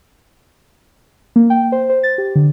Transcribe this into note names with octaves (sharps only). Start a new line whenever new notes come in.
A#3
G5
C5
C5
A6
G4
D3